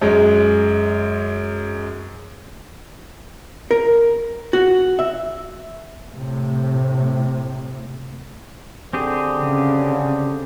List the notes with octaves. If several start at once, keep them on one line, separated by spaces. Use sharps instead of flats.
F#2 G#3
A#4
F#4
E5
A2 C3
D3 C4 G4 G#4
C#3